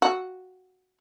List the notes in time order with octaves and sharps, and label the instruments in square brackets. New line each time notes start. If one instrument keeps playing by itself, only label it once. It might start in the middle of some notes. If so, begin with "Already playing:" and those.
[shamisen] F#4